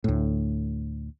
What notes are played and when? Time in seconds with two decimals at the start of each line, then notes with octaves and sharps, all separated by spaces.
0.04 D2 A2